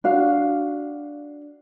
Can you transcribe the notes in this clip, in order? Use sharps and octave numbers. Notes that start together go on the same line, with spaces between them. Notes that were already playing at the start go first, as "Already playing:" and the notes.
D4 F#4 F5